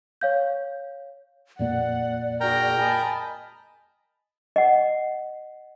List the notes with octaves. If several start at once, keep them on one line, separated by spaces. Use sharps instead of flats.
C#5 F5 G6
F2 A#2 A#3 D5 F#5
D4 F#4 G#4 A#4 G5 A#5
D#5 G#5 A5 B5
D#5 F#5